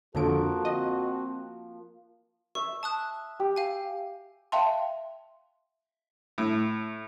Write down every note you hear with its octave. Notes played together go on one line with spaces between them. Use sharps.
F2 D3 F3 A#3 F#4 A4 D7
C4 D#5
E5 C#6
A5 D#6 F#6
G4
F5 G#5
E5 F5 G5 A5 C6
A2